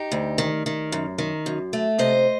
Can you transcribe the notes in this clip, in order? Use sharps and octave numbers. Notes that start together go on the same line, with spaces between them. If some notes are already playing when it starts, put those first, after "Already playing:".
Already playing: D#4 G4
D2
D#3
D#3
F#2
D#3
F#2
A3
C3 C5 D#5